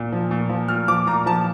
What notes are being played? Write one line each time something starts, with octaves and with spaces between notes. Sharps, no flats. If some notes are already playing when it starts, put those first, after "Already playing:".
Already playing: A#2
F3
A#2
F3
A#2 F6
F3 D6
A#2 A#5
F3 A5